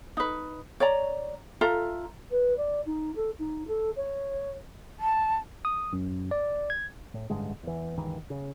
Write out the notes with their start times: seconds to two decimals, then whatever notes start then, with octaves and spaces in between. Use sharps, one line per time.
0.17 D#4 B4
0.80 C#5 D5 A#5
1.61 F4 A4 E5 A#5
2.30 B4
2.56 D5
2.85 D#4
3.15 A4
3.38 D#4
3.67 A4
3.96 C#5
4.99 A5
5.65 D#6
5.93 F#2
6.31 D5
6.70 G#6
7.14 A2
7.30 A1 G2 D3 G#3
7.63 E2 E3
7.96 G1 C#2 D#3 E3
8.30 C#3